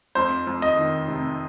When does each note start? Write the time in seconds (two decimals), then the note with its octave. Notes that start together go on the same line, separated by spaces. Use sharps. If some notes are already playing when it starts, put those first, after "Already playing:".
0.15 F2 C5
0.47 F2
0.62 D#5
0.77 D#3
1.08 C3